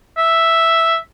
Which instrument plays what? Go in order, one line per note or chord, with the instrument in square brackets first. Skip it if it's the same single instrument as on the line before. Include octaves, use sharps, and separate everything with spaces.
[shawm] E5